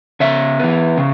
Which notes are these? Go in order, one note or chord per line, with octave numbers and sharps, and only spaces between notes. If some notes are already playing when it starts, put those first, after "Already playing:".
C#3 C#5 E5
E3 B3
C#3